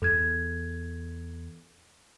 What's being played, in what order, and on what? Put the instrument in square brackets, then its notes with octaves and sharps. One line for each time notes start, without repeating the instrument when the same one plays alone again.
[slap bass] E2 [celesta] A4 G#6